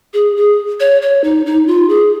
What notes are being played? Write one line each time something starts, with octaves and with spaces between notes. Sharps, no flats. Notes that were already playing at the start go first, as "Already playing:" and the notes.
G#4
G#4
C#5
C#5
D#4
D#4
F4
G#4